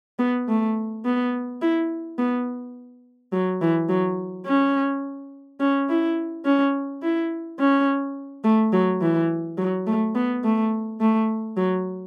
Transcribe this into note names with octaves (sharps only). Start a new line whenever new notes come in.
B3
A3
B3
E4
B3
F#3
E3
F#3
C#4
C#4
E4
C#4
E4
C#4
A3
F#3
E3
F#3
A3
B3
A3
A3
F#3